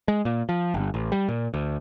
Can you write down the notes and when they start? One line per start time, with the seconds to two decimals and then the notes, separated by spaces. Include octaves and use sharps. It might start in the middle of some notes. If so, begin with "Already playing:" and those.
0.08 G#3
0.25 A#2
0.49 F3
0.74 G1
0.94 A1
1.12 G3
1.29 A#2
1.54 D2